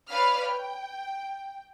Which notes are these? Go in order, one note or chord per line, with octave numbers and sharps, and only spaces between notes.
B4 C#5 D5 F5 B5 F6
G5